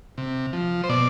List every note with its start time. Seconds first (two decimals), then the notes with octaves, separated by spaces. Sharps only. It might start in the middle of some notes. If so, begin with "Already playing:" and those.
0.18 C3
0.53 F3
0.84 C5
0.89 B2 D5